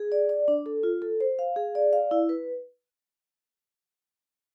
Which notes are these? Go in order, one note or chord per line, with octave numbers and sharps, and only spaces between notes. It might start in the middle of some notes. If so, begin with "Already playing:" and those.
Already playing: G#4
D5
D5
D4
A4
F4
A4
C5
F5
G#4
D5
F5
E4
B4